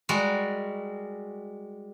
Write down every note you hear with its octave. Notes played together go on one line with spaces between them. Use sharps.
G3 G#3 F#4 A#4